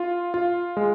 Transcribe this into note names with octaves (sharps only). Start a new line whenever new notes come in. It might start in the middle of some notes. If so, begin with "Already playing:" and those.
Already playing: F4
F4
G#3